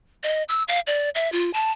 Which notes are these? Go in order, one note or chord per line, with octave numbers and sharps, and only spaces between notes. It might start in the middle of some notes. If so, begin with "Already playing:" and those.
D#5
E6
F5
D5
E5
F4
A5